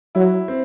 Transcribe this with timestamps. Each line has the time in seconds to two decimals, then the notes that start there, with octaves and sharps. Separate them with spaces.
0.15 F#3 E4
0.48 C4